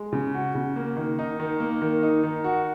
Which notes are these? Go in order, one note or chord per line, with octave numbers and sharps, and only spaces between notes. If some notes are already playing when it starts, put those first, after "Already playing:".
Already playing: G#3
C#3
F#4
C#3
A#3
D#3
D#4
D#3
A#3
D#3
D#4
D#3
F#4